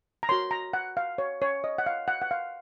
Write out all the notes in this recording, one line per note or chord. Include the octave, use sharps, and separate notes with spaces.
A#5
F#4 A#4 C#5 C6
A#5
F#5
F5
C#5
C#5
D#5
F#5
F5
F#5
F#5
F5